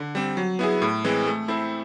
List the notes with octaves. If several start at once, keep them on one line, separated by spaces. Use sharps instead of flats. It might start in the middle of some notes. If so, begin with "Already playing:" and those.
Already playing: D3
G3 C4
F#3
B3 E4 G#4
A2
E3 G#3 C4
A3
C4 E4 A4 C5